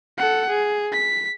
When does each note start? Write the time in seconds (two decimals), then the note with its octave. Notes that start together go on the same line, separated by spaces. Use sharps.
0.18 A4 F#5
0.49 G#4
0.92 B6